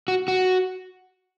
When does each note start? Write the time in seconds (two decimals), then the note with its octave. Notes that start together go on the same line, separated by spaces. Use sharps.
0.08 F#4
0.28 F#4